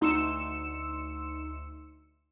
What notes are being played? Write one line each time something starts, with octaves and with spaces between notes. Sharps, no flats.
D2 D#4 C6 E6 C#7 E7